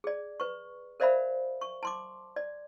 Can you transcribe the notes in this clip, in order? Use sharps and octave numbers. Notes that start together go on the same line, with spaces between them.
G#4 D5
B4 C#6
A#4 C5 D5 E5 F5 B5
C#6
A5 C6 D6
D5